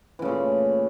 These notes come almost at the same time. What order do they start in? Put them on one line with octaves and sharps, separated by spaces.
E3 C#3 A3 A#2